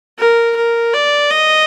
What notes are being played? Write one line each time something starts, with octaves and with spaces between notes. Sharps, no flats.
A#4
A#4
D5
D#5